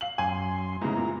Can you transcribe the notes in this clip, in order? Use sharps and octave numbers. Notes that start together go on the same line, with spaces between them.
F5 F#7
F#2 G#5 C6
G#2 C#3 B3 E4 A#5
A#2